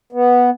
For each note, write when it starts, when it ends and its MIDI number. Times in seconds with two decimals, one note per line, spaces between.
0.12 0.50 59